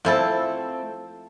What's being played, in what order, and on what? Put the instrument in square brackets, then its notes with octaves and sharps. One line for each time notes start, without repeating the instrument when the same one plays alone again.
[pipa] F3 E4 A4 [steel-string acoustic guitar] A3 C4